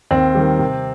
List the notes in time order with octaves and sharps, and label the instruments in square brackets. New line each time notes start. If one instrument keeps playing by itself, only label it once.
[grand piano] D#2 [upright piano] C4
[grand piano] D#3 G3
C3